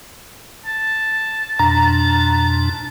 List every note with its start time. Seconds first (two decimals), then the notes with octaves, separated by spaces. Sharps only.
0.66 A5
1.59 F2 B2 D4 A#5